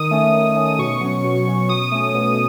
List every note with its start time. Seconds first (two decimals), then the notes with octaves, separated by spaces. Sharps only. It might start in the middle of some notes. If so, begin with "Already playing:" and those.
Already playing: D#3 D#6
0.11 A3 C#4
0.33 D#3
0.56 A3 C#4
0.65 D#6
0.78 B2 C#6
1.01 F#3 C#4
1.24 B2
1.47 F#3 C#4
1.69 B2 D#6
1.91 A3 C#4
2.14 B2